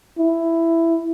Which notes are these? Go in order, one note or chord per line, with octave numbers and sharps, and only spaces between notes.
E4